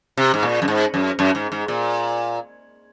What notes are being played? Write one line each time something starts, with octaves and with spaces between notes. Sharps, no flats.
C3
G#2
A#2
F#2
G#2
F#2
F#2
G#2
G#2
A#2